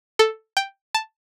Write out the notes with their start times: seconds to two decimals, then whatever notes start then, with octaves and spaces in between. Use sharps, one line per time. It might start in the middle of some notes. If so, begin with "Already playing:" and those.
0.19 A4
0.57 G5
0.95 A5